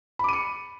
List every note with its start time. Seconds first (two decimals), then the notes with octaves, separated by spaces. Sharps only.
0.19 B5
0.24 D6
0.29 D#7
0.33 C#7